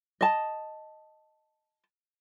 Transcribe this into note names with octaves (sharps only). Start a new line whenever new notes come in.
D#5 A5